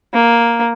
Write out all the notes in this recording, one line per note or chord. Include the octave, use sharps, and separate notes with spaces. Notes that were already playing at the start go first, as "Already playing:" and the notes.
A#3